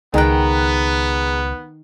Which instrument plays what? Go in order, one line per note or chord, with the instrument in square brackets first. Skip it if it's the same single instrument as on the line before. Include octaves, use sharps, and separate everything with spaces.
[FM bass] C#2 [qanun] D#3 G5 [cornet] B3 [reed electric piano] G#4 A#5 F#6